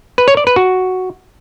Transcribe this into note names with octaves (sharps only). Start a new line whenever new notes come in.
B4
C#5
D5
B4
F#4